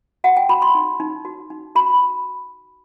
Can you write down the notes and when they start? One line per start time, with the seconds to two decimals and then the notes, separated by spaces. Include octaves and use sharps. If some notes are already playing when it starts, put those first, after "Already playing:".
0.24 F#4 F#5
0.37 G5
0.49 F#4 B5
0.62 C6
0.75 D#4
1.00 D#4
1.25 F#4
1.50 D#4
1.75 F#4 B5